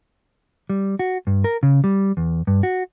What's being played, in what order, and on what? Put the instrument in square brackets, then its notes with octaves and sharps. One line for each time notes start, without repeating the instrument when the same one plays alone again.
[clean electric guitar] G3
F#4
G2
A#4
C#3
G3
E2
G2
F#4